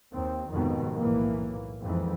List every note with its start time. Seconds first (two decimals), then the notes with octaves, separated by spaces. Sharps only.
0.12 D#2 C4
0.52 F1 F2 G#2 B2 D#3
0.97 B1 A2 E3 A#3
1.82 F2 G#2 E3